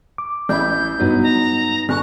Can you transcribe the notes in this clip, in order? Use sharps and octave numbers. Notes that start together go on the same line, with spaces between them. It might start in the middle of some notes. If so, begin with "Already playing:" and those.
D6
A1 E4 B5 G6
G2 B2 F#3 B3 D#4
A#5
G1 G#4 C#6 F#6